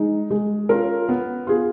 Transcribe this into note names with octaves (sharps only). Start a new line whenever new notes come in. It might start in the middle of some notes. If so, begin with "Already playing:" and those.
Already playing: G#3 D#4
G#3
C#4 F4 A#4
B3
F4 G#4